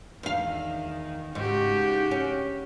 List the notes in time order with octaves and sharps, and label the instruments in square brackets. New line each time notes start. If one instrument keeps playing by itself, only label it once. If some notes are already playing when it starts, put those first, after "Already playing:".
[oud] E2 F5 [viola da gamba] D#3
[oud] G#2 [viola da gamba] C#3 F#4 G4
[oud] C#4